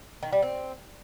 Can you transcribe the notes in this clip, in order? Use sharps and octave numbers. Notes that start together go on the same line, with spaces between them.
D#3
G3
C4